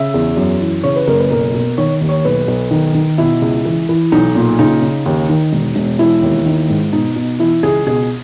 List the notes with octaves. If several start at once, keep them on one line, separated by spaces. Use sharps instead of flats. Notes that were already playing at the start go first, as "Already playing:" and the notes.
Already playing: C#3 E5
E2
F#2
E3
C#3 C#5
B4
F#1 A#4
B4
B1 A#4
B2
D#3 C#5
D#2
C#5
B1 B4
B1
D#3
D#3
B2 E4
C#2
E3
E3
B1 D#4
A#2
C#3 D#4
C#3
D#2
D#3
E1
E1
E3 E4
D#2
D#3
G#2
B2 D#4
B2
E3 E4
C#2 G#4
B2 G#4